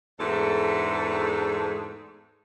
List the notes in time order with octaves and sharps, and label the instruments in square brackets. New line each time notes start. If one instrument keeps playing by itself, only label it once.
[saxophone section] E2 G#2 A3 D4 F#4 A4